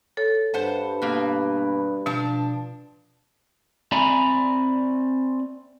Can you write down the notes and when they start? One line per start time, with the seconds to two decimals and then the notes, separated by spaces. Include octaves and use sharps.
0.17 A4 C#5
0.54 G2 B4 C5 F#5 A5
1.02 B2 A#3
2.06 B2 F3 D4 A5
3.92 C4 D5 E5 G#5 A#5 B5